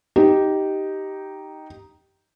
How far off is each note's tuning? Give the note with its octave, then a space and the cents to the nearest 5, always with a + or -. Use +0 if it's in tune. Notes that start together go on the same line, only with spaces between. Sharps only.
D#4 +0 G4 -10